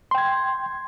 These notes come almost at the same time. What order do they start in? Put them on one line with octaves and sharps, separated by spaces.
C6 G5 G#6